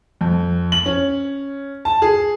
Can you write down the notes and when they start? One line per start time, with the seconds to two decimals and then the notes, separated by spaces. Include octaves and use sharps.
0.21 F2
0.72 F#7
0.86 C#4
1.85 A5
2.02 G#4